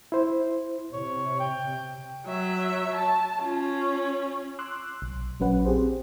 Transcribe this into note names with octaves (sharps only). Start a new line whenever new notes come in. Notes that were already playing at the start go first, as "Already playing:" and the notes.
E4 C5
C3 C#5
G5
F#3 E5
A5
C#4 F4
C6 D6 E6 F#6
B1
A#1 F#3 C#4 B4 F#5
C4 G4 G#4 C5